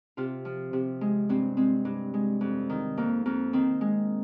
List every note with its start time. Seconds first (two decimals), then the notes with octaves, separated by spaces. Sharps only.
0.17 C3 F4
0.45 F3
0.73 C3
1.01 G#3
1.29 G2 C4
1.57 G#3 C4
1.85 G2
2.14 G#3
2.41 F2
2.70 D#3
2.97 F2 A#3
3.26 F2 A#3
3.53 D#3 C4
3.81 G#3